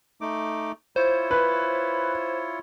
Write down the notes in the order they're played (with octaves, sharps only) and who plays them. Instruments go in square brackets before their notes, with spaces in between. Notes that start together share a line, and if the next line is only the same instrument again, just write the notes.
[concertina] A3 D#4 D6
[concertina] E4 F4 C#5 [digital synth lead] C5
[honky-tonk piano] B4